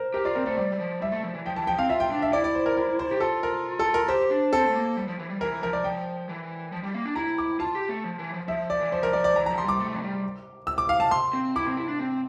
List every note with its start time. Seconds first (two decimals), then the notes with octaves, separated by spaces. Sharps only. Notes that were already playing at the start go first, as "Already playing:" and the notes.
Already playing: A#4 C5
0.14 G4 A#4
0.25 F4 D5
0.35 C4 A#4
0.46 A3 C5
0.57 G3 D5
0.73 G3
0.79 F3
1.01 G3 E5
1.12 A3
1.23 F3
1.34 E3
1.45 F3 G5
1.56 E3 A5
1.67 F3 G5
1.78 C4 F5
1.89 F4 E5
2.00 G5
2.11 D4
2.22 E5
2.33 E4 D5
2.44 D5
2.55 C5
2.66 A#4
2.77 A#4
2.99 C5
3.11 G4
3.20 F4 A4
3.43 A#4
3.79 A4
3.94 A#4
4.08 G4 C5
4.31 D4
4.53 C4 A4
4.67 A3
4.74 A#3
4.97 G3
5.08 F3
5.19 E3
5.30 G3
5.41 E3 A#4
5.62 F3 A#4
5.73 D5
5.84 F3 G5
6.29 E3
6.72 F3
6.83 G3
6.94 A#3
7.05 D4
7.16 E4 A#5
7.38 D6
7.60 F4 A5
7.75 G4
7.89 A3
8.04 F3
8.19 E3
8.34 F3
8.48 F3 E5
8.70 D5
8.80 E3
8.92 F3 C5
9.03 A#4
9.13 F3 D5
9.24 D5
9.36 E3 A#5
9.46 F3 A#5
9.58 C6
9.65 G3 D6
9.80 A3
9.94 F3
10.02 G3
10.67 E6
10.78 D6
10.89 F5
11.00 A5
11.11 C6
11.33 C4
11.56 E4 D6
11.67 C4
11.77 E4
11.88 D4
11.99 C4